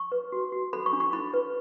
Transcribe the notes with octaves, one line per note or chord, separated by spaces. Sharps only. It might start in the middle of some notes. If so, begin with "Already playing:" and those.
Already playing: C#6
B4
F#4
F#4
A4 B5
C#6
D4
C#6
E4 B5
B4